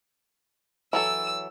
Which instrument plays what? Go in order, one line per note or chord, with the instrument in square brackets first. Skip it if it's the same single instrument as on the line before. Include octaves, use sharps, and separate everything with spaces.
[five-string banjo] E3 F#3 A4 [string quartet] E6